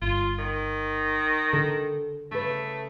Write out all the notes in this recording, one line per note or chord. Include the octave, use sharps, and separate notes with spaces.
G1 F4
D#3
D3 A4
C#3 A3 B4